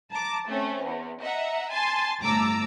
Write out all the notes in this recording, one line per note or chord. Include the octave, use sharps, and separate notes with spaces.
A5 A#5 D6
A3 C4 C#4
E2
D#5 E5 F#5 A#5
G#5 A5 C6 A6
G1 A2 A5 A#5 D6 E6